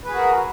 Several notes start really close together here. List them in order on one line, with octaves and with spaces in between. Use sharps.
B4 G#4 F#4 A#4